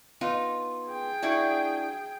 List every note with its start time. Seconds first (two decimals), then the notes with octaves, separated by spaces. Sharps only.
0.21 B3 D#4 F4
0.88 G#4 G5
1.23 D4 E4 F#4